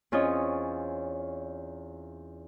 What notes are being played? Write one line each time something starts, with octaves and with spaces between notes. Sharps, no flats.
E2 C4 C#4 F4 C#5 D#5